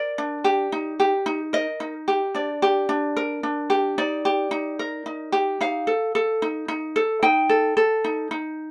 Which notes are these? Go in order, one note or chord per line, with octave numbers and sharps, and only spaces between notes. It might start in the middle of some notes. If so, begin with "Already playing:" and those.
Already playing: A#4 D5
D4
G4
D#4
G4
D#4
A#4 D#5
D#4
G4
D4 D5
G4
D4
A#4
D4
G4
D#4 D5
G4
D#4
A#4
D#4
G4
D#4 F5
A4
A4
D#4
D#4
A4
D#4 G5
A4
A4
D#4
D#4